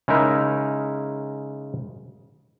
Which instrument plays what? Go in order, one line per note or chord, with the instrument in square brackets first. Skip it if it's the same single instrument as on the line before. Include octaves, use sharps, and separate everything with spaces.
[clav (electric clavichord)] C#3 G#3 D#4 E4 A#4